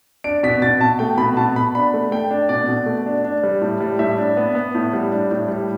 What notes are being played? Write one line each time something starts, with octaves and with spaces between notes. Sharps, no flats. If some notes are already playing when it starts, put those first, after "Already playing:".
D4 D7
B2 B6
B2 A6
B2 A5
A3 G5
B2 B5
B2 A5
B2 B5
D4 B5
A3
A3 G5
D4
B2 D5
B2
A3
D4
D4
G3
A2
G3
A2 E5
D4
B3
B3
A2
G3
D4
A2
G3